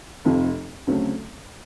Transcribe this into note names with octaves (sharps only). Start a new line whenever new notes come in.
F1 F2 C3 F3
D2 C#3 F#3 A3 C4